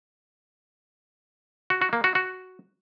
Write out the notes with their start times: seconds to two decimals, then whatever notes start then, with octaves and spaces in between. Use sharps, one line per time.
1.70 F#4
1.82 F#4
1.93 A#3
2.04 F#4
2.15 F#4